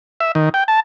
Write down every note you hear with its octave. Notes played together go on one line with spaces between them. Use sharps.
E5
D#3
G5
A5